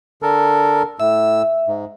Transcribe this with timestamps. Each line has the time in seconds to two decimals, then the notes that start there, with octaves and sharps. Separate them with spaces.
0.23 D3 A4 A#4
1.00 A2 E5 E6
1.68 G#2